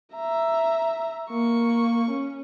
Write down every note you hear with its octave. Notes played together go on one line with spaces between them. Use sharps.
E5 A#5
A#3 C#6
C#4